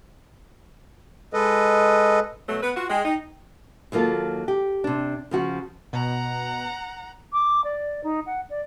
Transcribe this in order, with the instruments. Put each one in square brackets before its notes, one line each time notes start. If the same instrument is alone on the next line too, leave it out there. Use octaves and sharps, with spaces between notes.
[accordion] G#3 A4 B4 D#5
[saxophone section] B2 F#3 A3
B3 B4
F4 F#4
[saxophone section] G#3 [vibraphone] G5
[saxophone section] D#4
[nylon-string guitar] D#2 F#3 A#3 F4 A4
G4
C3 D4
C#3 F3 F#4
[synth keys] B2 [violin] F#5 A#5
[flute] D6
D5
D#4
F#5
D5